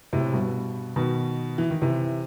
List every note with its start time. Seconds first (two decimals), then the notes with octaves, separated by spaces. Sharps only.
0.13 A2 C3
0.33 G2 B2
0.96 B2 D#3
1.58 E3
1.70 D#3
1.82 C3 E3